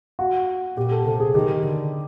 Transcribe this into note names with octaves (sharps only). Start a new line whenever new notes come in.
F#4
A#2 G4
A4
C3 A4
G#4
D#3 G4
D3